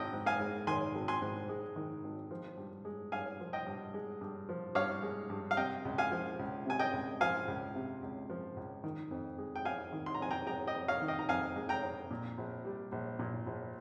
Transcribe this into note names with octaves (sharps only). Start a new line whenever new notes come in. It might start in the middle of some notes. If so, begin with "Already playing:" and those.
Already playing: G#1 D#3 D#5 G5
G#2
F5 G#5
G#3
D#3 G#5 C6
G#1
G#5 C6
G#2
G#3
D#3
G#1
F3
G2
G#3
G2 F5 G#5
F3
D#5 G5
G2
G#3
G2
F3
G2 C#5 F5
G#3
G2
F5
C3 D#5 G5
C#2
F5 G#5
F3
C#2
C3 G#5
D#5 G5
C#2
F3 F5 G#5
C#2
C3
C#2
F3
C#2
D#3
F2
G#3
G5
F2 F5 G#5
D#3
C6
A#5
F2 G#5
G5 A#5
G#3 G5 A#5
D#5 G5
F2
C#5 F5
D#3
D#5 G5
A#5
F2 F5 G#5
G#3
G5 A#5
F2
A#2
A#1
G3
A#1
A#2
A#1